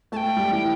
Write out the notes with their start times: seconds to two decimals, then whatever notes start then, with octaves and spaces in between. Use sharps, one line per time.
0.12 A3 A5
0.16 G5
0.37 G3
0.51 E3